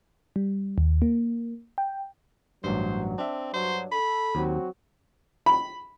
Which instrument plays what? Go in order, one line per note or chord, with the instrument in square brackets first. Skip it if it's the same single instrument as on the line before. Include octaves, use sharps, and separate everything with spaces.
[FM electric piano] G3
D#2
A#3
G5
[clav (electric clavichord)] A1 G2 [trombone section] F#3 [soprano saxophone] C5
[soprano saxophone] C4 [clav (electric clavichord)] D4 E5
[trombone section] G2 F#3 [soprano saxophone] C5
[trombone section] A4 [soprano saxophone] B5
[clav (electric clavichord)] D#2 [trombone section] F#3 C4 F#4
[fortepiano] B5